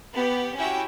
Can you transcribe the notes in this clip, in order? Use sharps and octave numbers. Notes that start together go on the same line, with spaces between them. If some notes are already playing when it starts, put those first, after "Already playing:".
B3 G4
C#4 E4 F#4 G4 G5